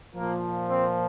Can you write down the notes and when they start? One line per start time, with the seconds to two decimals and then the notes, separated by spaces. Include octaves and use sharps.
0.14 A#2 F3 A#3
0.68 C4